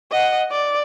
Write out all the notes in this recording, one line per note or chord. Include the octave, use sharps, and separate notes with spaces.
D#5 F#5
D5